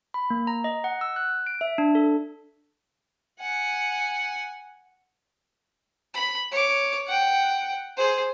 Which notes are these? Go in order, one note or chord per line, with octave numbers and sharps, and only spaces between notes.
B5
A#3
A#5
D#5
F#5
E6
F#6
D7
E5
D4
A4
F#5 G#5
B5
C#5 D6
F#5 G5
G#4 C5